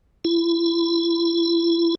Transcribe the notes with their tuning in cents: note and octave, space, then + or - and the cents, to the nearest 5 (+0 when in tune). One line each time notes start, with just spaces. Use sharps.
E4 +35